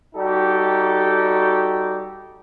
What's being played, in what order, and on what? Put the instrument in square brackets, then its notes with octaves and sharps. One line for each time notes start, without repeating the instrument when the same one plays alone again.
[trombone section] G3 D#4 F#4 G4 A4